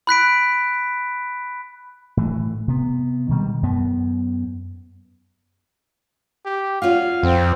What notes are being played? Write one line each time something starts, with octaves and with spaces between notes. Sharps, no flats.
B5 F#6 B6 D7
A2 E3
C3 B3
B2 D#3 G3 G#3
F#2 B3
G4
C#4 F4 F#4 F5
F2 C4